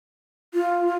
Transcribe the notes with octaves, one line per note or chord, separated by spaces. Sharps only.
F4